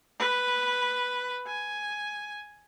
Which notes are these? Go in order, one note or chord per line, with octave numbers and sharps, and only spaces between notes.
B4
G#5